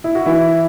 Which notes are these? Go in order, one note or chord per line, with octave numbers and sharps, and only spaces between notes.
E4
F#4
E3 E4